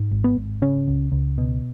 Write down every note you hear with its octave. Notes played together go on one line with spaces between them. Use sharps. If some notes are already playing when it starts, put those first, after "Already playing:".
Already playing: G#2
G#1
B3
G#1
C#3 C#4
C#2
C#2
B2